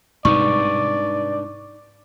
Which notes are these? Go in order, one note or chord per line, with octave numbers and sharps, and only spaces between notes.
G#2 C3 G3 D4 D#4 B4 D5 C#6